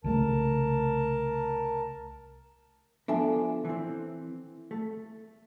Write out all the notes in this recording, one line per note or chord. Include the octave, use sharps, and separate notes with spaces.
C2 C#3 A3 A#4 A5
F3 B3 D4 A4 E5 G#5
E3 C4
A3